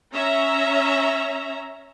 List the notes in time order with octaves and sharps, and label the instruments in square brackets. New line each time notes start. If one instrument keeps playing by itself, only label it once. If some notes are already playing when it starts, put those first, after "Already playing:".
[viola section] C#4 E5 A#5